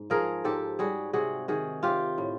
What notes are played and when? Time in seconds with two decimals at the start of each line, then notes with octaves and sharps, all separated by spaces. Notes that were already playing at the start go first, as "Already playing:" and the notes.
Already playing: G#2
0.10 F3 G#4 A#4
0.44 G#2 G4 A4
0.79 G3 F#4 G#4
1.13 C3 F#4 G#4
1.48 D#3 F#4 G#4
1.83 C3 F4 G4
2.18 A2